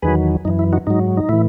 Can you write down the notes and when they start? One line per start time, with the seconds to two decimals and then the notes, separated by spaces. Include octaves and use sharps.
0.02 E2 D#3 F#3 G#4 B4
0.45 F#2 D#4
0.48 E3
0.59 E4
0.73 D#4 F#4
0.87 G#2 F#3 D#4
1.17 D#4
1.29 A2 E3 E4